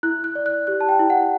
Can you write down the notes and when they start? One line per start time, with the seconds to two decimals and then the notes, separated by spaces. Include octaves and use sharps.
0.03 E4 F#6
0.24 F#6
0.35 D5
0.46 F#6
0.67 G4 F#6
0.81 A5
0.89 G5
0.99 E4
1.10 F#5